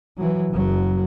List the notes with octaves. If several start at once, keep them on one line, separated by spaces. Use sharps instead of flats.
E3 F#3
F#1 F#3